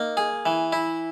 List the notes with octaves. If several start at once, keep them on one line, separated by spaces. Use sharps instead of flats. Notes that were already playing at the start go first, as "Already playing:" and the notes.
Already playing: A#3 D#4
G#4
E3
E4